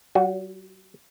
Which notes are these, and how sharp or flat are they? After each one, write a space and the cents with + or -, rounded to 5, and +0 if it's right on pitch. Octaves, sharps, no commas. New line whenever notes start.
F#3 +45 F#4 -20